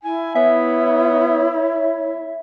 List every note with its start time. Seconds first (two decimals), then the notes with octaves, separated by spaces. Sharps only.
0.04 E4 G#5
0.35 B3 C#5 E5